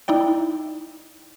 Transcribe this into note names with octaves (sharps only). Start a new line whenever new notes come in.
D#4 E4 D5 G5